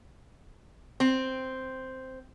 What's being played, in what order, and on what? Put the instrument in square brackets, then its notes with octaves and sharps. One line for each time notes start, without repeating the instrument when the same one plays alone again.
[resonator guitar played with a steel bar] C4